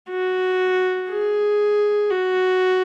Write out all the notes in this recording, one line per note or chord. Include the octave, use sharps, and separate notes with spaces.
F#4
G#4
F#4